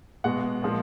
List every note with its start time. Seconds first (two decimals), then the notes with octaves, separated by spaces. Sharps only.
0.24 B2 G#3 F#5
0.62 A#2 F3 G#3